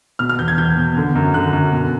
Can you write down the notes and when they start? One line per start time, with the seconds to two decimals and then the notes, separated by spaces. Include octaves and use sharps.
0.19 B2 F6
0.29 F6
0.39 E2 G6
0.48 G#6
0.58 E2 G6
0.77 B2
0.97 D3
1.15 F#2
1.34 D3 F#6
1.53 F#2
1.72 B2